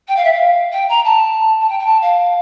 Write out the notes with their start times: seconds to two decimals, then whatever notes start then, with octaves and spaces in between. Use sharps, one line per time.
0.07 G5
0.16 F5
0.24 E5
0.32 F5
0.72 G5
0.89 A#5
1.04 A5
1.61 A5
1.69 G5
1.79 G5
1.85 A5
2.01 F5